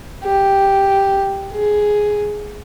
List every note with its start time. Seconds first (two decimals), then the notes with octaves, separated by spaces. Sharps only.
0.24 G4
1.52 G#4